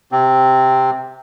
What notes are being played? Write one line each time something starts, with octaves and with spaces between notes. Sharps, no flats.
C3 C4